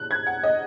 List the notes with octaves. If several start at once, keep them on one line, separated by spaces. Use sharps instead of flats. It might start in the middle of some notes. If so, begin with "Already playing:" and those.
Already playing: F#6
G#6
F#5
D#5